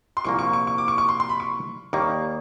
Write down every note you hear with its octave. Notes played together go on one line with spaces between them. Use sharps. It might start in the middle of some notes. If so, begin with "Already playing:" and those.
C6
C2 A#2 F3 A#3 C#6
C#6
C#6
C#6
D6
C#6
C#6
C6
C6
B5
C#6
D#2 D#3 G3 A#3 D#4 C#6